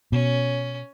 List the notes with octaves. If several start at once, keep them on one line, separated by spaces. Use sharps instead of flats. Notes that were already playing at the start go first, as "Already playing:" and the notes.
B2 C#4